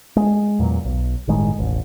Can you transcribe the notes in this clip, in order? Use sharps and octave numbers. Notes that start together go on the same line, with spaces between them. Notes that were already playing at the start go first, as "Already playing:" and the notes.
G#3
E2 A#2 F#3
B1
G1 A2 D#3 G#3
E1 A1